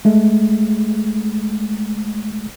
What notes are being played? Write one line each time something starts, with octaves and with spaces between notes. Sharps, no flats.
G#3 A3